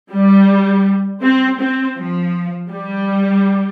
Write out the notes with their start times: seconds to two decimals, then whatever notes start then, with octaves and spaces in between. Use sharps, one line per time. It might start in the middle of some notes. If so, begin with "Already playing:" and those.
0.11 G3
1.22 C4
1.59 C4
1.97 F3
2.71 G3